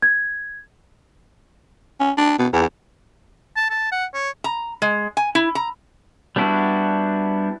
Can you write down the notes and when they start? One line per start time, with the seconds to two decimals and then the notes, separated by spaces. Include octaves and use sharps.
0.02 G#6
2.00 C#4
2.17 D4
2.38 B2
2.53 E2
3.57 A5
3.70 A5
3.92 F#5
4.14 C#5
4.44 A#5
4.82 G#3
5.17 G#5
5.35 E4
5.55 A#5
6.36 G3 B3 D4 E4 F#4